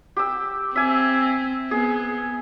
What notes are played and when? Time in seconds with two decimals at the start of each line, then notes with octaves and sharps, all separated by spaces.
0.16 G4 E6
0.76 C4 E5 G#5
1.71 B3 G#4